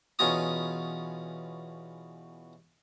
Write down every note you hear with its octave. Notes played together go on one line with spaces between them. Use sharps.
E2 B2 C#4 F4 A#5 D#6